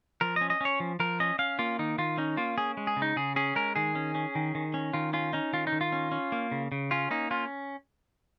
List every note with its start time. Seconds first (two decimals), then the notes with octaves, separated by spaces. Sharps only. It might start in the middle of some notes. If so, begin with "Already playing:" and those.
0.21 F3 A#4
0.36 D#5
0.41 C#4
0.50 D#5
0.61 C#4 C#5
0.80 F3
1.00 F3 A#4
1.20 C#4 D#5
1.39 C#4 F5
1.59 A#3 F4
1.79 D#3 D#4
1.98 D#3 F4
2.18 C#4 D#4
2.37 A#3 F4
2.58 C#4 G#4
2.77 G#3
2.87 G#4
2.96 C#3
3.02 D#4
3.16 C#3 G#4
3.36 C#4 G#4
3.56 G#3 A#4
3.76 D#3 G#4
3.95 C#4
4.15 C#4
4.35 D#3
4.55 D#3
4.74 C#4
4.93 D#3 F4
5.13 C#4 F4
5.33 C#4 D#4
5.53 D#3 F4
5.67 D#4
5.72 D#3
5.81 F4
5.92 C#4
6.12 C#4
6.32 A#3
6.52 C#3
6.72 C#3
6.91 C#4 F4
7.11 A#3 D#4
7.31 C#4 F4